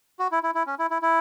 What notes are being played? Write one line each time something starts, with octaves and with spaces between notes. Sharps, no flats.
F#4
E4
E4
E4
C#4
E4
E4
E4